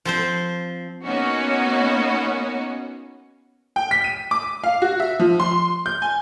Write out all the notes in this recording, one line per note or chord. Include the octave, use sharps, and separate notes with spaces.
F3 C4 C5
A#3 B3 C#4 D#4 F#4
G5
B6
D#7
D6
F5
F#4
E5
F3
C6
G6
G#5